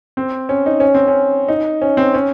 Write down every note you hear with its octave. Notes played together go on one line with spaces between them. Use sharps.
C4
C#4
D#4
C#4
C4
C#4
D#4
C#4
C4
C#4